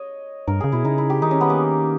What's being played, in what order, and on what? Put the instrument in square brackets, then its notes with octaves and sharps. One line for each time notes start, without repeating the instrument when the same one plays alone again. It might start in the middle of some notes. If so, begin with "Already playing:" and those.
Already playing: [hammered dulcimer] C#5 D#5
[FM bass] G2 [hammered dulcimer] A#4
[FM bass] C#3 [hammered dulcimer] G#4
[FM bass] B2 [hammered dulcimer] E4
[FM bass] C#3 [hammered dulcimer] D#4
[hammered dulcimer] E4
G4
[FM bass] D#3 [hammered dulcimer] D#4
[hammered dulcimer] C#4
B3
A#3